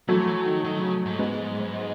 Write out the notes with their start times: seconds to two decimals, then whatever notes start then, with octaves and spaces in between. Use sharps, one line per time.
0.09 E3 F#3 A3
0.27 E3
0.45 D#3
0.64 D#3
0.78 C#3
1.06 G#2
1.19 G#3 B3